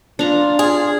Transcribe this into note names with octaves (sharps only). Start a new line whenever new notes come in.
D4 F4 A#5
G#4